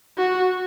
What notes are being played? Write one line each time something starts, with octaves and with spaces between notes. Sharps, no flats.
F#4